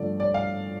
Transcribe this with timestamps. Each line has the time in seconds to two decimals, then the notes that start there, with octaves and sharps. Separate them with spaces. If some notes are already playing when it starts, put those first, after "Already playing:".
Already playing: G2 D3 F3 A3 D5
0.20 D5
0.34 F5